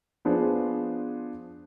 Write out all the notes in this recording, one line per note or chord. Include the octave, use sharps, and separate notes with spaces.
F3 B3 D4 G#4 C5